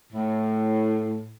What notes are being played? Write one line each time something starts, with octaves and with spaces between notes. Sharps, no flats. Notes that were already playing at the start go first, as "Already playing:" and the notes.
A2